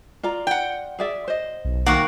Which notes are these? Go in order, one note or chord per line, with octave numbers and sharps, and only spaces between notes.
F4 D5 A#5
F#5 G5
G#4 D5 E5
C5 D#5
B1
D#3 A#3 F#4 F#5